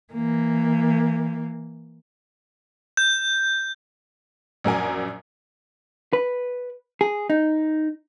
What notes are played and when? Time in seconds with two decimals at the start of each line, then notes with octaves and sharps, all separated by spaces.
0.13 E3 A#3
2.97 G6
4.64 A#1 F#2 A#4 G#5
6.13 B4
7.01 G#4
7.30 D#4